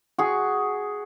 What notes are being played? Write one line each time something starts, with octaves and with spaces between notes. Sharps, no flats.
F#4 G#4